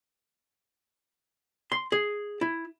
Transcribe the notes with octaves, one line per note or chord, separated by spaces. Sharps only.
C6
G#4
E4